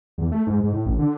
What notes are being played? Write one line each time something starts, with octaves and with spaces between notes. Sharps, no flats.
E2
A3
G#2
G#2
A2
A1
D3